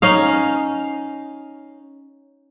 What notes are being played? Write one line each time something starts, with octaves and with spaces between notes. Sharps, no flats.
C#4 D#4 F5